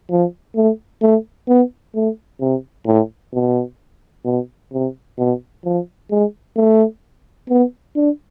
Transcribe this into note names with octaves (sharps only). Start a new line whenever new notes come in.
F3
A3
A3
B3
A3
C3
A2
B2
B2
C3
B2
F3
G#3
A3
B3
D4